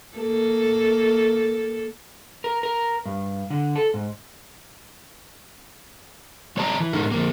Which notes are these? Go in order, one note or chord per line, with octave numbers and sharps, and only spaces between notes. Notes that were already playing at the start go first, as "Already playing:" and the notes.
A#3 A4
A#4
A#4
G2
D3
A4
G#2
G3 C#5 D5 A5 A#5
E3
G#2 C#4 D#4 A#4
F2 A#3